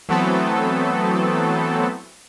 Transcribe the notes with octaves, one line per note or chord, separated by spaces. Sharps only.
E3 F#3 A3 B3 C4 A4